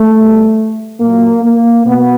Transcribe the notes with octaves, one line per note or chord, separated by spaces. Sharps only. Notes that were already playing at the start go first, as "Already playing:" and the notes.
Already playing: A3
B2 G3
A#2 F#3 A#3
A#3
B2 F#3 B3